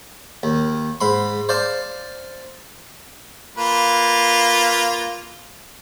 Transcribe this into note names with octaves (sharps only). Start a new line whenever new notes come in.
D#2
G#2 B5 C6
C5 D5 F5 A5
A#3 F4 B4